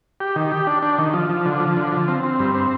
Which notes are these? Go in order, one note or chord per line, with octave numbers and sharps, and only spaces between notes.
G4
D#3
G4
D4
D4
D#3
F3
F3
D3
F3
D3
F3
C4
C4
G2
C4